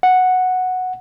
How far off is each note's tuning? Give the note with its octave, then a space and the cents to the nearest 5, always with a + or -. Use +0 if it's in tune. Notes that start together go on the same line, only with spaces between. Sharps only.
F#5 -5